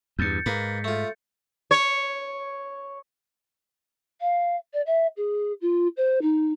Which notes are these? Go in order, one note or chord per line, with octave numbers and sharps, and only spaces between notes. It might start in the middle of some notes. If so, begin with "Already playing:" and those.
E2 G2 G6 A6 C#7
G#2 A#3 B4
A3 F4
C#5
F5
D5
E5
G#4
F4
C5
D#4